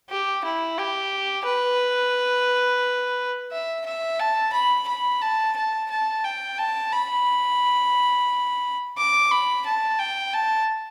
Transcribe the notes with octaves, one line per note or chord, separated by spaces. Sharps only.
G4
E4
G4
B4
E5
E5
A5
B5
B5
A5
A5
A5
G5
A5
B5
D6
B5
A5
G5
A5